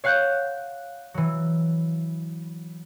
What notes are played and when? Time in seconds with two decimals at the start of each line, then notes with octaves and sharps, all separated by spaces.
0.04 C#5 F5 F#5 F#6 G6
1.14 E3 F#3